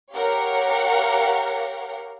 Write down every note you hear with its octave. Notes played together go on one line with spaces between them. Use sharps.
G4 A#4 C#5 F5 F#5